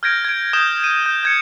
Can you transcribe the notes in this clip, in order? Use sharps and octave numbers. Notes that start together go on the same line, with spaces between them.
F6 G6 G#6 A#6 D7
G#6 D7
D#6 G6 E7 G7
D#7 E7
G6
G6 G#6 C#7